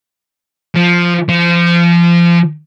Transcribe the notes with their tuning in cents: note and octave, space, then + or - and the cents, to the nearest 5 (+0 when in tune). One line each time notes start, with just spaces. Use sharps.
F3 +0
F3 -25